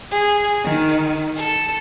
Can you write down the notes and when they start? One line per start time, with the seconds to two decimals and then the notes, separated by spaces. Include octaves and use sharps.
0.11 G#4
0.64 D#3
1.36 A4